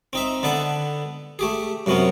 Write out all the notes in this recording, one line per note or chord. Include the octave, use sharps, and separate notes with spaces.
C4 D#4 E5
D3 B3 A4 E5 B5
A3 G4 G#4
F#2 C3 F#3 B3 C#4